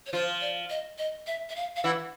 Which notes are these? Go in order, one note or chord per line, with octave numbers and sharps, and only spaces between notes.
C#5
F3 F4 C5
D5
D#5
D#5
E5
E5
F5
F5
E3 E4 F#5